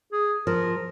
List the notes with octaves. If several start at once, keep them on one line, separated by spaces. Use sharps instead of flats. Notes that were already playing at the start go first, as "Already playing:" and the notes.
G#4
F3 A#4